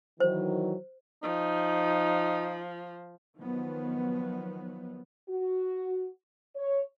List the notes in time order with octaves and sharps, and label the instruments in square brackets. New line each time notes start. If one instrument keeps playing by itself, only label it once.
[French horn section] D#3 E3 F#3 [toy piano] C5
[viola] F3 [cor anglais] D#4
[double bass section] D#3 F3 F#3 B3
[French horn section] F#4
C#5